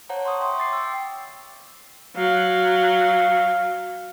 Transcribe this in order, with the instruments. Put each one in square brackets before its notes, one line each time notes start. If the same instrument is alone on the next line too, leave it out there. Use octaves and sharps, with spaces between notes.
[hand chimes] C5 C#5 F#5 A5 A#5
C6 C#6 D#6
E5 G5 C6 C#6
D6 A6 C7
G5 E6
[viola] F#3 [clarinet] F5